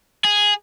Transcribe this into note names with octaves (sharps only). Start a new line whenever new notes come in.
G#4